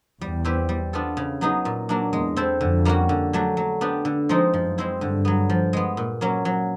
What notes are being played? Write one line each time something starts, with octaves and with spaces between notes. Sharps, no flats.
E2 G3
C4 E4 G4 B4
G3
B3 D4 F4 A4
C#3
F#3 B3 D#4 G#4
A#2
F#3 A#3 D4
E2 G#3
C4 E4 A4 C5
F2 D3
G3 A#3 C#4 F#4
D3
F#3 A3 D4
F#3
B3 D4 G4
D3
F3 G#3 C4 D#4
F#2 F3
G#3 C4 E4
G2 D3
F#3 B3
F3
G#3 B3
A#2
F#3 A#3 C#4
F#3